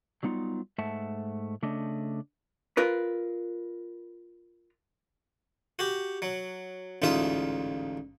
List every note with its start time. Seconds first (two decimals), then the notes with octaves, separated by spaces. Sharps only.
0.23 F#3 G3 B3 D#4 F4
0.78 G#2 A3 E5 F#5 A5
1.62 C#3 A3 D4 D#5
2.77 F4 A#4 B4
5.79 F#4 G4
6.22 F#3
7.02 A1 D2 G#2 F4 E5 D#6